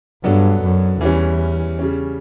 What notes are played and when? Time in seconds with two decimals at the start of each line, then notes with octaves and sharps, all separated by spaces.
0.24 G2 F#3 B3 D4 A4
0.63 F#2
1.01 E2 E3 G3 C#4
1.79 C#3 G3 C#4